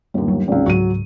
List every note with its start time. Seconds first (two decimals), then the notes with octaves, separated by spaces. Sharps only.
0.14 G1 D#2
0.28 F#3 G3
0.48 G#1 C#2
0.66 C#2 G#2 F#3 D#7